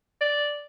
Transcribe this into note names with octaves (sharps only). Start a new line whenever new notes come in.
D5